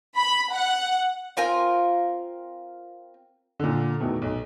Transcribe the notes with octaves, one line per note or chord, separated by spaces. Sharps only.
B5
F#5
C4 F4 A#4 G#5
A#2 D3
E2 B2 D#3 A3
B1